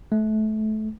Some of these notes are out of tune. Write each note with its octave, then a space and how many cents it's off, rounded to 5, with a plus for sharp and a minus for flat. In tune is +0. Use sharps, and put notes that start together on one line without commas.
A3 -25